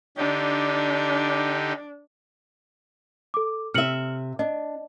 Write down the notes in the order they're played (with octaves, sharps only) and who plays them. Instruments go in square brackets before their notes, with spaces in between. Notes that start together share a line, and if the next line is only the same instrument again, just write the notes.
[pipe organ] D3 D#4 G4 [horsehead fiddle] D4
[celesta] A4 D6
[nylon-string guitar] C3 E5 [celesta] F6 C#7 F#7
[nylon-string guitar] D4 [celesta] D#5